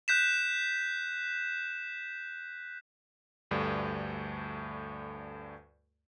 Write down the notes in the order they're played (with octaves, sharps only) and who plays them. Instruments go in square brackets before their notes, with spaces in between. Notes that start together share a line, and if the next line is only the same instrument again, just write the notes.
[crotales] F#6 G6 B6 E7
[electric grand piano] D2 G2 A3 D5